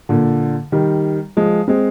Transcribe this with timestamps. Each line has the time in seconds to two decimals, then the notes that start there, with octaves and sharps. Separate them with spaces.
0.09 A#2 D3
0.72 D#3 G3
1.37 F3 G#3
1.68 G#3 C4